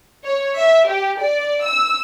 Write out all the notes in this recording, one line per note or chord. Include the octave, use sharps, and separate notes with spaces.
C#5
E5
G4
D5
E6